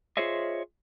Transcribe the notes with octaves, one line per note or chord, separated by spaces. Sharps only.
F4 G#4 C5 C#5 D#5 E5